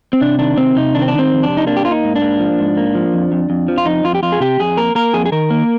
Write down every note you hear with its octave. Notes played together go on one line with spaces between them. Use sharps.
C4
C3 D4
D#3 D4
C3 C4
C3 D#4
D#3 D4
C4
D#3 D4
C4
F2
D4
C3
D#4
A#3 D4
G4
A#3 F4
D#4
G#2
D4
A#3
F3
G#2
A#3
F3
F2
F2
F2
F3
F4
F2 D#4
F2 F4
G4
F2 F4
G#4
C3 G4
F2 G#4
A#3 A#4
A#3 A#4
F2 G#4
G#4
D#3 A#4
A#3